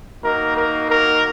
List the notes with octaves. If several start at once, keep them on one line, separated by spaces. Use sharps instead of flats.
A#3 D#4 F#4 A#4
A#4
A#4